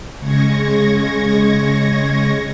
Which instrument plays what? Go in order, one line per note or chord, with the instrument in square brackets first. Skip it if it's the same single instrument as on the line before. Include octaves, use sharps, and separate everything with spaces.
[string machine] C#3 G#3 C#6 G#6 A#6